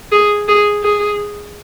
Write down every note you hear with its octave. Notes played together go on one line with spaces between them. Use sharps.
G#4
G#4
G#4